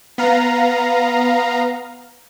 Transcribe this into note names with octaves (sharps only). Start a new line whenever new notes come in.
B3 F5 A#5